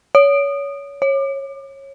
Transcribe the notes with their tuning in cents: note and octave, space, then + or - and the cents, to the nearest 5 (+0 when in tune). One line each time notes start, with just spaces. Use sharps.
C#5 +25
C#5 -20